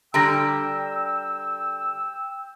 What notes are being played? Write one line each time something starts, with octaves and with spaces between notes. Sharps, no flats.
D3 G3 G4 G5 A#5 E6 A#6